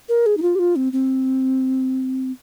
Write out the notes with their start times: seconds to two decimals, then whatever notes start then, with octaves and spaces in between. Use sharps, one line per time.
0.09 A#4
0.26 G#4
0.37 D#4
0.42 F4
0.55 G4
0.59 F4
0.76 C4
0.93 C4